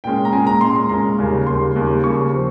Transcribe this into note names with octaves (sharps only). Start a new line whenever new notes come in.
A#2 G#3 C#4 G5
A#5
A#2 G#3 C#4 G#5
A#5
A#2 G#3 C#4 C6
C6
A#2 G#3 C#4 A#5
D#2 C#3 G3
D#2 C#3 G3 C6
D#2 C#3 G3
D#2 C#3 G3 C#6
F3 C4